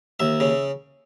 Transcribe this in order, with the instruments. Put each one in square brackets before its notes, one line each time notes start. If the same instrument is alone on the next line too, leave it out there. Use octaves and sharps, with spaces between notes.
[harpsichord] D#2 E5
C#3